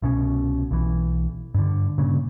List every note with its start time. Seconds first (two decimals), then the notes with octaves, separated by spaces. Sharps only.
0.02 C2 B2 C#4
0.71 B1 E3
1.54 G2 D3
1.98 G2 A#2 C#3